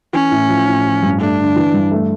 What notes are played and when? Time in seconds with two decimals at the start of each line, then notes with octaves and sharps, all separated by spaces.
0.13 E3 C#4
0.31 A2
0.49 F3
0.68 A2
0.85 F3
1.03 G2
1.20 A3 D4
1.38 D3
1.56 E3
1.74 G2
1.91 A3